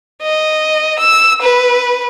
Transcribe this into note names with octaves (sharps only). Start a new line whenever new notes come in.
D#5
E6
B4